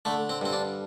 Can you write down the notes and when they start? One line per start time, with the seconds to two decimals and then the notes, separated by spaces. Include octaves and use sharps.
0.05 D3 A3
0.29 C4
0.41 G2 C4
0.53 D4